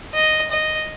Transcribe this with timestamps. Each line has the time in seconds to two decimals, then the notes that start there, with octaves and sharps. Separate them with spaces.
0.14 D#5
0.51 D#5